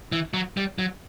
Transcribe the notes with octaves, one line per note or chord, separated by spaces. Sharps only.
E3
F#3
G3
F#3